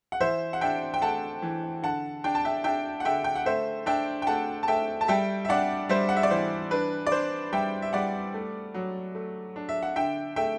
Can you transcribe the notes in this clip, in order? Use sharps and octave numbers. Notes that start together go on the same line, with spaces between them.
F#5
E3 C5 E5
F#5
D4 E5 G5
G5
A3 F#5 A5
E3
D3 F#5 A5
D4 G5
A5
E5 G5
D4 E5 G5
F#5
D3 E5 G5
G5
F#5
A3 C5 E5
D4 E5 G5
G5
A3 F#5 A5
A5
A3 E5 G5
A5
G3 E5 G5
E5
D4 D5 F#5
G3 C5 E5
F#5
E5
D5
E3 C5
D4 B4
D5
D4 C5
G3 E5 G5
E5
G3 D5 F#5
A3
F#3
A3
D4
E5
F#5
D3 E5 G5
A3 E5 G5